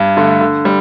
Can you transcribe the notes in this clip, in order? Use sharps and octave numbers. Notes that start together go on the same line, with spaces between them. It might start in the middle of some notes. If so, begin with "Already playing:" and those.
Already playing: G2
D3 A3
D3
G3